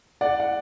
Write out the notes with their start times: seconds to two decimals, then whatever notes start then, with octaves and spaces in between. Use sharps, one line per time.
0.21 D5 F#5
0.40 F#5